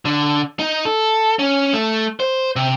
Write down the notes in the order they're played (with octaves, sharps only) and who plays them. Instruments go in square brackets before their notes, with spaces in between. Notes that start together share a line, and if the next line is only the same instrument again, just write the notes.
[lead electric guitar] D3
D#4
A4
C#4
A3
C5
C3